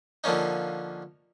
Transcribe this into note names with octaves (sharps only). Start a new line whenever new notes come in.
D3 F3 A#3 C#4 D#4